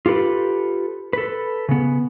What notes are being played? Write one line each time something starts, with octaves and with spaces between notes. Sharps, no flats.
F4 G4 A4 B4
A4 B4
C#3 B3